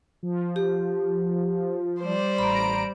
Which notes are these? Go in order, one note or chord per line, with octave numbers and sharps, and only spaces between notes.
F3
G4
G3 C5 D5
A1 A#5 B5 D7